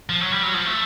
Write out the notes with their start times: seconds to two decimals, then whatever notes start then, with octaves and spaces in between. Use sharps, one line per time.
0.09 F3
0.21 F#3
0.32 G3
0.43 F#3
0.54 F3
0.66 A3